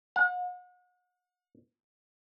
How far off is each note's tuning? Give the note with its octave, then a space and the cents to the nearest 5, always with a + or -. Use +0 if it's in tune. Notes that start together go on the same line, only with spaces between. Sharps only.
F#5 -40